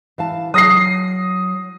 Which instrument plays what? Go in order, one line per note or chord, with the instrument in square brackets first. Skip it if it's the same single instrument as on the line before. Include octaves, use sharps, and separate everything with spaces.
[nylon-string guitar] E3 F5 A5
[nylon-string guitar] F#3 [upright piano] D#6 A#6 C7